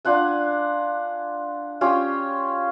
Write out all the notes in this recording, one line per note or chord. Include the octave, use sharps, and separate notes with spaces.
D4 F4 F#5 G#5
C#4 F4 G4